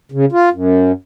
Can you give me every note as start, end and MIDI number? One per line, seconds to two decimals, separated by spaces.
0.12 0.25 49
0.32 0.49 65
0.53 0.92 42